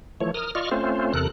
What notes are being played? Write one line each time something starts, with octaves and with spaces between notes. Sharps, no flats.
E3 F3 A3 C#5
A#4 D#6 F6
F4 D5 D#5 C#6 F6
A3 C4 C#4 F4 C5
E2 C3 A4 A#4 F#6